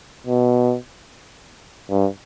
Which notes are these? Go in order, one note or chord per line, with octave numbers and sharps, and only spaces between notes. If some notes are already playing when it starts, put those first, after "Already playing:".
B2
G2